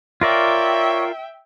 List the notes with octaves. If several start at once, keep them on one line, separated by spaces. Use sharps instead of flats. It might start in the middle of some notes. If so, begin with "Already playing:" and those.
F4 A#4 C#5 D5 E5 G5